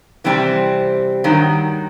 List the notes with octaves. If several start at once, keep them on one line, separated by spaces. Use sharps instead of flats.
C3 E3 G3 C4 E4
G2 D#3 F#3